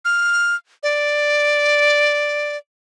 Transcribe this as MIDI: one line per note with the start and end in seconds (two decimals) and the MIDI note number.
0.05 0.55 89
0.83 2.57 74